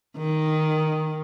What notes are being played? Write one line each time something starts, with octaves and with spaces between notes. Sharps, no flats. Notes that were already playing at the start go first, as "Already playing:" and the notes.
D#3